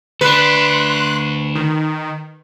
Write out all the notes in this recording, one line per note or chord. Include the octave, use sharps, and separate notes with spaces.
D2 D4 B4 C6 F#6
D#3